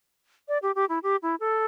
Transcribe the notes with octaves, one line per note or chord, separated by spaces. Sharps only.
D5
G4
G4
E4
G4
E4
A4